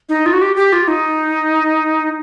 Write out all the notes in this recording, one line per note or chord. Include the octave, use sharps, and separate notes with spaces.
D#4
F4
F#4
G4
G4
F4
D#4